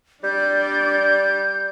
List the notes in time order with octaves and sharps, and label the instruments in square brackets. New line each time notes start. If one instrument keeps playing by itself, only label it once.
[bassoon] G3 [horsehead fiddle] D4 D5 [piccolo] G6